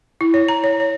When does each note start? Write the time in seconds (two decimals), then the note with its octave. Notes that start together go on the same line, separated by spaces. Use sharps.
0.21 E4
0.34 C#5
0.48 A#5
0.64 C#5
0.80 C#5